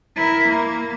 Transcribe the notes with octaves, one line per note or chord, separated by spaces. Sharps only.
E4 A#4
A#3